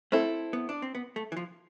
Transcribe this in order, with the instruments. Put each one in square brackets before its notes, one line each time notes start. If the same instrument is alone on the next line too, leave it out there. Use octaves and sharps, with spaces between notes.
[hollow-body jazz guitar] A3 [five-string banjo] C4 E4 A4
[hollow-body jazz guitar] B3
D4
C4
B3
A3
E3
F3